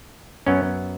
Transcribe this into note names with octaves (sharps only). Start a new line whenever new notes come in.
F#2 F#3 B3 C#4